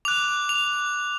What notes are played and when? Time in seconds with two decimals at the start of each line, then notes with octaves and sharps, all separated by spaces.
0.05 D6 F#6 F7
0.49 F7